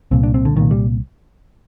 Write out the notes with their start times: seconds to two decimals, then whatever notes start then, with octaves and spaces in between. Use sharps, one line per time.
0.11 C2 A#2 C4
0.23 D4
0.34 C4
0.45 D3
0.56 C2 A#2 D#3
0.71 G3